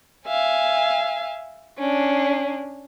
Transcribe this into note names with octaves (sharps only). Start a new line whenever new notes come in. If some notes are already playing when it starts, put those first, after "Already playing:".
E5 F5 G#5
C#4 D4